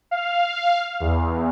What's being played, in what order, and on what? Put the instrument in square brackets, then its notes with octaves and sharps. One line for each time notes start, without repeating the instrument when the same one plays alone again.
[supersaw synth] F5
E2